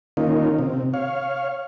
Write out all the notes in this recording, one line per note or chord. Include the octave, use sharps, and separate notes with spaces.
D#3 A#3 C#4 D#4 F4
C3
C#5 F5